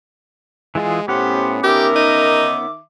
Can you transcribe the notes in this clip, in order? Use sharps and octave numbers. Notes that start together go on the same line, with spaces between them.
E3 G#3 F4 G#4
A2 B3 C#4 G4 C5 F#5
D#3 G4 A#4 E5 D6
D#4